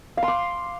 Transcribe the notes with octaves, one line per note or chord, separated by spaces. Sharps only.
F5
C6
D6